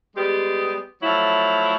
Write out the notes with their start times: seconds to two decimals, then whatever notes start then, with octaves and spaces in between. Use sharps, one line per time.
0.15 G3 G#3 B3 G4
1.02 F3 F#3 A3 E4